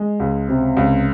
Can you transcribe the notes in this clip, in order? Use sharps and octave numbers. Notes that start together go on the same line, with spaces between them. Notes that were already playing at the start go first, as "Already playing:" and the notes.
Already playing: G#3
C#2
C3
C#2